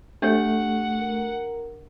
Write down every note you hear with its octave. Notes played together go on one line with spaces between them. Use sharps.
A3 D4 G4 C#5 F#5
A#4